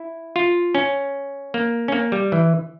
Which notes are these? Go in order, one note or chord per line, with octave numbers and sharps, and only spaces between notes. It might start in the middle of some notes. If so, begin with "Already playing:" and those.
Already playing: E4
F4
C#4
A#3
C#4
A#3
G3
E3